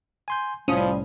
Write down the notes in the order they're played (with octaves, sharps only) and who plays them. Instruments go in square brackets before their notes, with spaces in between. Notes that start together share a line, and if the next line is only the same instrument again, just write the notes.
[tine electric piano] G#5 C6 G6
[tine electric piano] C2 A2 [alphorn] F3 [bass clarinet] G3 [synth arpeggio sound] C#4 D#6